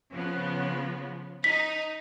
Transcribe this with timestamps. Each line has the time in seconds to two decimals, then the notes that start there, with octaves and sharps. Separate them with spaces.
0.10 C#3 F3 B3
1.44 D#4 B6